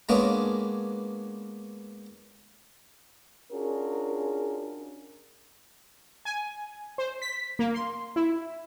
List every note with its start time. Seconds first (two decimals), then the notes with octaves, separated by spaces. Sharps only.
0.09 G#3 A#3 B3 C#4 D4
3.52 C#4 D4 F4 F#4 G#4 A#4
6.25 G#5
6.98 C5
7.22 B6
7.59 A#3
7.74 C6
8.16 E4